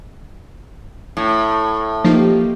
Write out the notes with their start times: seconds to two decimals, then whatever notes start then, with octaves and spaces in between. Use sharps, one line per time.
1.17 A2
2.04 F3 A#3 D#4 G4